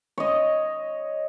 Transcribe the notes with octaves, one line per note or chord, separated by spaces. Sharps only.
C#5 D#5